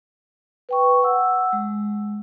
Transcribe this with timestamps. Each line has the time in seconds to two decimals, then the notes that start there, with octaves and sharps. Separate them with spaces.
0.69 B4 G5 C#6
1.03 F#5 E6
1.53 G#3